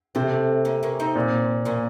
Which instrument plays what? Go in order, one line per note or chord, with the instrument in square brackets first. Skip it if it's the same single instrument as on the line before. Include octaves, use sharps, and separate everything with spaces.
[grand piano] C3 [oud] A3 C4
[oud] A#3 C#4
A#3 C#4
C4 D#4
[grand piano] A#2
[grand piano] A#2 [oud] A#3 C#4